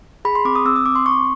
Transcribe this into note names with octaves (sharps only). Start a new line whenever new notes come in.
G#4 B5
C6
C4 D6
D#6
C4 E6
D#6
C4 D6
C6
C4 C#6